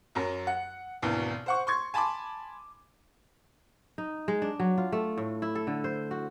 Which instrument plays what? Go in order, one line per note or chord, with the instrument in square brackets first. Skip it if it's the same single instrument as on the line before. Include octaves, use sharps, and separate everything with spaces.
[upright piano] F#2 F#3 A#4
F#5
G#1 D2 B2 E3
C5 F#5 C#6
C6 C#6 G#6
G#5 A5 B5 C6 D6
[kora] D#4
G#3
D4
F#3
F4
A3
A2
E4
A4
D3
C5
F#4